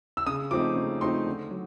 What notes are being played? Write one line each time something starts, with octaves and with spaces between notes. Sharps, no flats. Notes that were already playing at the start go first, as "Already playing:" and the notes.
E6
C#3 D#6
F3 A3 C4 D#4 D6
C#3
F3 A3 C4 D#4 C6
D3
F#3